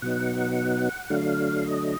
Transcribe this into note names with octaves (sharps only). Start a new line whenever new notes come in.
B2 F#3 B3 D#4 F#5
D3 F#3 A3 D4 F5
D#5